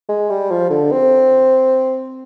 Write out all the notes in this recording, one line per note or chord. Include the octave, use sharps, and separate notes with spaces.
G#3
G3
F3
D3
C4